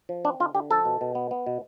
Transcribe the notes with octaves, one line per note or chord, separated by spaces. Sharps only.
F3
C4 D4
D3 F4
D3 G4
F3 A4
B2
B2
B3
B3
B2